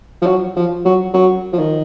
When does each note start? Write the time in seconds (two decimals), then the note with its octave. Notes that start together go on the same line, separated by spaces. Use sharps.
0.22 F3
0.26 F#3
0.56 F3
0.85 F#3
1.14 F#3
1.53 F3
1.59 D#3